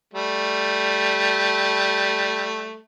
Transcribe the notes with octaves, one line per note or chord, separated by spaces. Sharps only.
G3 A3